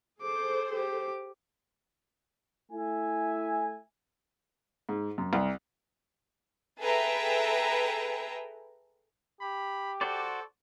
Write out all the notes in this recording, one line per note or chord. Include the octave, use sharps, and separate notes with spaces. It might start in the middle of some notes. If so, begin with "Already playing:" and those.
G#4 A4 C5 D6
G4 D6
A3 E4 E5 G#5
G#2
F#2
C2
G#4 A4 B4 E5 G5 A#5
G4 B5
F#4 A4 C5 D5